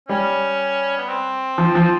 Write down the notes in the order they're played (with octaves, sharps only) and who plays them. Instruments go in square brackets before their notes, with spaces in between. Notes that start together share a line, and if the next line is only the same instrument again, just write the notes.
[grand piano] G3 [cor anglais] C#4
[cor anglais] B3
C4
[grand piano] F3
F3